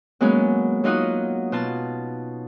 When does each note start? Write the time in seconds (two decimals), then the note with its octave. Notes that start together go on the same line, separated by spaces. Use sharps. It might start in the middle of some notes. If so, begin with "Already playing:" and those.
0.21 F#3 G#3 A#3 B3 C#4
0.84 F#3 D#4 F4 F#4 D#6
1.52 B2 F4 A5